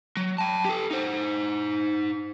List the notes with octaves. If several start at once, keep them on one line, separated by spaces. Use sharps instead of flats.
F#3
G5 A5
G4 A4
D#4 C5